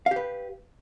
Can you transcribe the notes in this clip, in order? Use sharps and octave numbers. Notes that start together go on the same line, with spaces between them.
G4 B4 F5